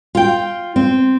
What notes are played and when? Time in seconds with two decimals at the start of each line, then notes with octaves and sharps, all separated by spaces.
0.15 F4 G5
0.76 C4